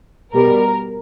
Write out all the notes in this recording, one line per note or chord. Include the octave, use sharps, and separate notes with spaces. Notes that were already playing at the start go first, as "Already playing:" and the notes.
B2 G3 A#4